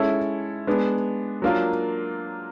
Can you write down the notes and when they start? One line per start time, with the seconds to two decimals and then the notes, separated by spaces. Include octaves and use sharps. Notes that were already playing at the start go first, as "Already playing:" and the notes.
Already playing: G#3 C#4 E4 A4
0.67 G#3 B3 D4
1.42 F#3 A#3 D4 F4 A#4